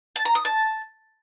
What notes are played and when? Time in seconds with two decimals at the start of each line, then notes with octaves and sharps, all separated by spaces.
0.16 A5
0.25 A#5
0.35 D#6
0.45 A5